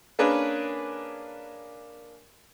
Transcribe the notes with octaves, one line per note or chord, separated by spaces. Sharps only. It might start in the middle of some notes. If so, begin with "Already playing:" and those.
A#3 C#4 D4 G#4 A#4 B4